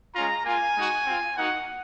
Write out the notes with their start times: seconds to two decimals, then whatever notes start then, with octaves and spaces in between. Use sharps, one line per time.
0.14 G#3 C#4 F4 A#5
0.45 A#3 F4 G#5
0.76 G#3 D#4 F#4
1.06 C4 F4
1.36 A#3 D#4 F#4 F#5